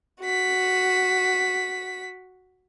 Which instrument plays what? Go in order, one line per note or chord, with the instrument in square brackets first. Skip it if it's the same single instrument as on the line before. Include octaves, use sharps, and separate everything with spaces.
[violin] F#4 B6